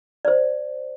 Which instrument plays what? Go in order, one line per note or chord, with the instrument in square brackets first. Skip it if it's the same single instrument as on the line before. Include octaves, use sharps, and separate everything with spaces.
[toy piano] C5 D5